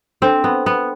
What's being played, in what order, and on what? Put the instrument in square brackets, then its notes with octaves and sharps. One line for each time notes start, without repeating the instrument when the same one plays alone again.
[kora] C4 [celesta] D4 A4 C5 G5 C6
[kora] B3
B3